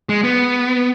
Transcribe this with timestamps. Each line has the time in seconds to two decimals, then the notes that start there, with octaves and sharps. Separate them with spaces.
0.09 G#3
0.24 B3